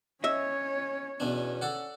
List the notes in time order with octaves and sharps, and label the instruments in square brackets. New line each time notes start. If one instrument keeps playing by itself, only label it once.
[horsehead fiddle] C#4 C#5 [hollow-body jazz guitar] D#5 E5
[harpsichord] E2 B2 D4 [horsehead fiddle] C#4
[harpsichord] A4 D5 F#5